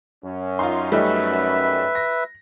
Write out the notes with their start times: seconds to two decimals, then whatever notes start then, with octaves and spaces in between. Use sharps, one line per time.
0.24 F#2 C#4
0.59 D#4 F4 C6
0.92 G3 A3 D#4 B4 E5
1.95 A#6